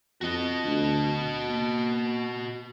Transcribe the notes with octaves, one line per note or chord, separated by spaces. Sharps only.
F2 F#4 D#5
D2
A#3